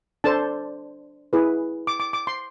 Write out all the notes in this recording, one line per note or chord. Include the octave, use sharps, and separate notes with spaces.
D4 A4 C5 A5
E4 G#4 B4
D6
D6
D6
C6